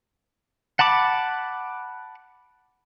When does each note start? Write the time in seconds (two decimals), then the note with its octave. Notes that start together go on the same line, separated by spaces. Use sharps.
0.79 F#5 A5 B5 D6